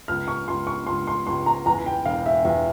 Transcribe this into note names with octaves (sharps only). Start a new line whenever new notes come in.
C#2 F6
C#6
C#2 C6
C#6
C#2 C6
C6
C#2 C6
A#5
E2 A#5
G5
E1 F5
E5
E2 E5